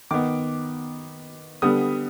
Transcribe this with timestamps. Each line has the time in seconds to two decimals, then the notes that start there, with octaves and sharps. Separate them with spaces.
0.11 D#3 B3 D6
1.62 D3 G3 B3 D#6